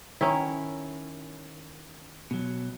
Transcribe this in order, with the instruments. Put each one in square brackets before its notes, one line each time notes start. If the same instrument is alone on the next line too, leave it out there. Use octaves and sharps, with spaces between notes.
[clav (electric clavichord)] D#3 [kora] C#4 E4
[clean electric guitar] B2 F#3